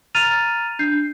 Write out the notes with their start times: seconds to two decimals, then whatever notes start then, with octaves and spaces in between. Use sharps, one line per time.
0.15 A#5 F6 A6 D#7 F7
0.79 D4 G6 C7